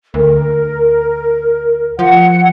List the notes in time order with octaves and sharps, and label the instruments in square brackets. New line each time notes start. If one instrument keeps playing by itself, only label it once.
[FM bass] D2 [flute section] A#4
[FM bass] F3 [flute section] F#5